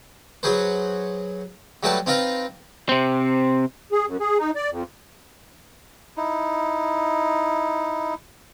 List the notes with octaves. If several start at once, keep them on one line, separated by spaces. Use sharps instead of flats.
F#3 F#4 G#4 B4 C5
F#3 G3 A3 G4 B4 A5
C4 D#4 F4 B4 F5 A#5
C3 C4
G#4
F#2
G#4
D#4
D5
F2
D#4 E4